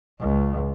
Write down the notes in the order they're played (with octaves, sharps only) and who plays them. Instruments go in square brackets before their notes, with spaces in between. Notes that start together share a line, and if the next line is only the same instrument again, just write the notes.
[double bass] C#2